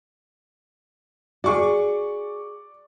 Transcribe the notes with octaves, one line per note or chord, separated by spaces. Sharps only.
F#4 G#4 D5 C#6 D6